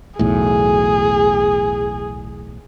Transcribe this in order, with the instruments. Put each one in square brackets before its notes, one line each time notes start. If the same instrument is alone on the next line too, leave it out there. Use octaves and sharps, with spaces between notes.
[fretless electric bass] B1 E2 A2 [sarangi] G#4